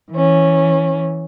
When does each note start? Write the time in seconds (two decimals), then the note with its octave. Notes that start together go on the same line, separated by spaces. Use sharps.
0.12 E3 C#4